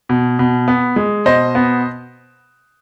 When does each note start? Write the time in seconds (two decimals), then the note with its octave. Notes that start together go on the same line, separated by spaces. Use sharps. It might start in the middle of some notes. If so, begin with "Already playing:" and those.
0.09 B2
0.39 B2
0.68 B3
0.96 G#3
1.25 B2 C5 D#5
1.55 B3